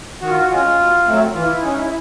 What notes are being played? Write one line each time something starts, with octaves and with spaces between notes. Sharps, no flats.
D#3 F#4
F4
F#4
G#3 C#4 F4
B2
F#3 A3 C4
E3 F4
E4
G#3 C#4 D#4
E4
E4